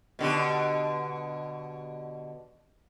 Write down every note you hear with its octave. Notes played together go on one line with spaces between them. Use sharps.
B2 D3 G4